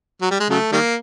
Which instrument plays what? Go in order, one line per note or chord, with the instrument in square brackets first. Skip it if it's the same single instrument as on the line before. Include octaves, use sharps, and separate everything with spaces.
[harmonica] F#3
G3
G#3
C#3 F#3 A3
D#3 G3 A#3